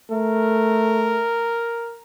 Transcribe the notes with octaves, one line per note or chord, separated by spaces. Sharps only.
A3 A#4